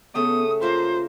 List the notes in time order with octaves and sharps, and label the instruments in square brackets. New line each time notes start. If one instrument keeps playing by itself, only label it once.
[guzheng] C#3 A3 G5 [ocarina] B3 [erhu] D#6
[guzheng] A#3 E5 F5 [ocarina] F4 [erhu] C5